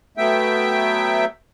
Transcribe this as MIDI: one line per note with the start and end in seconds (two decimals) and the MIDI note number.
0.17 1.25 54
0.17 1.25 57
0.17 1.25 59
0.17 1.25 76
0.17 1.25 79